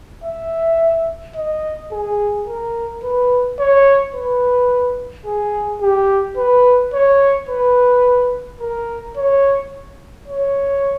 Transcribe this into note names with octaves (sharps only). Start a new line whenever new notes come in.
E5
D#5
G#4
A#4
B4
C#5
B4
G#4
G4
B4
C#5
B4
A#4
C#5
C#5